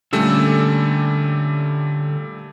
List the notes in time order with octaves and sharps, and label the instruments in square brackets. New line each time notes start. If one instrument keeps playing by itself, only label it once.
[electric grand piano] A#2 G3 A3 [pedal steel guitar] D3 C#4 E6